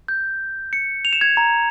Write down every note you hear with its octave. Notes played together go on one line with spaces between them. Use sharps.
G6
C#7
F7
E7
G#6
A#5